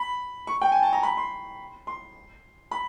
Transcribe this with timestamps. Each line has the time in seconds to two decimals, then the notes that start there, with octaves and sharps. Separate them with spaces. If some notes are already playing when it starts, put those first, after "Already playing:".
Already playing: B5
0.47 C#6
0.62 G5
0.72 G#5
0.82 A5
0.93 A#5
1.03 B5
1.17 C6
1.87 C6
2.71 B5